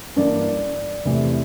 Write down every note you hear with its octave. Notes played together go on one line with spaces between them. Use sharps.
G2 E3 A#3 D5
E2 C3 E3 A3